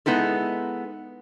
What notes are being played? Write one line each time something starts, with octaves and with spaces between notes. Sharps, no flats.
G#3 B3 D#4 E4 A4